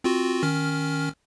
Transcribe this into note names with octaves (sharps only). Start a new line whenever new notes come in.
C4 F4 F#4
D#3 C#4 F6